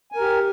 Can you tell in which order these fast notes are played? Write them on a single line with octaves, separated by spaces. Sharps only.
G#5 A#4 G4